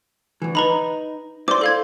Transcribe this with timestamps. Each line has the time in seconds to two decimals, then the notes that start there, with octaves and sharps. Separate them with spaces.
0.42 D2 E3
0.55 D#4 B4 A#5 B5
1.48 E4 C5 D5 C6 D6
1.61 A4 F5 G#6